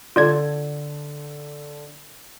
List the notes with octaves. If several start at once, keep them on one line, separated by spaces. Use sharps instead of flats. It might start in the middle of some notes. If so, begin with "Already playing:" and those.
D3 F4 A4 D5 G#6